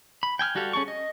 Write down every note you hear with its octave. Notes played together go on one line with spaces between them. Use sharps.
B5
G5 G#5 E6 F6
G3 F#4 G4 A4 F5
C#4 G#4 A4 C#6
D#5